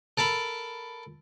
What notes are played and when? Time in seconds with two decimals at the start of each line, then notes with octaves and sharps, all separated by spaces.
0.18 A4 A#4 A5 B5